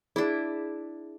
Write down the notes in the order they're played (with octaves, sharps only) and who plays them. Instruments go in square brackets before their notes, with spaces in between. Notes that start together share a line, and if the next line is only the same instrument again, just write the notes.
[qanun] D4 E4 [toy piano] G#4